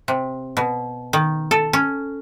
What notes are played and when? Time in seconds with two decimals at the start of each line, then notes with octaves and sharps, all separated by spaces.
0.08 C3
0.57 B2
1.13 D#3
1.51 A4
1.73 C#4